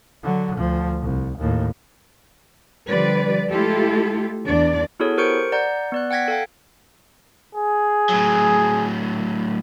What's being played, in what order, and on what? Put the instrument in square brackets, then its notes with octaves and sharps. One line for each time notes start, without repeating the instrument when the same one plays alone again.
[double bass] D3 F#3
D2 F3
C2
D#2 A2
[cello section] D3 F3 G3 B4 D5
G#3 A3 E4 F4 G4 A4
E2 D4 D5
[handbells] B3 E4 F#4 G#4 A4 C#5
G4 A#4 C5 C#6 C#7 D7
D5 F#5 A#5 G6
B3 D5 F#6
F#5 G5 G#6 A#6 B6
A4 F5 G5
[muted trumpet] G#4
[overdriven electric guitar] A2 F#3